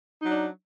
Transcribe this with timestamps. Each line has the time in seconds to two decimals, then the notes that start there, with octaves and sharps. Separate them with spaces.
0.20 D#4
0.25 F#3
0.30 D4